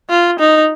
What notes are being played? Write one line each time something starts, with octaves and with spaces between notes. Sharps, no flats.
F4
D#4